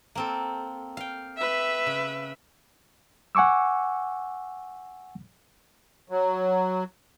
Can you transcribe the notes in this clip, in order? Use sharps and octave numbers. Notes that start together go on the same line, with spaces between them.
A#3 C4 A4
F5 G5
B4 E5
C#3
F#5 G#5 C#6 D6 E6
F#3